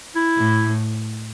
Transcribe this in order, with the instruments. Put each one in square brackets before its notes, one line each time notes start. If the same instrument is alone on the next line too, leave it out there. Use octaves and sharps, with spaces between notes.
[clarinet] E4
[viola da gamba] A2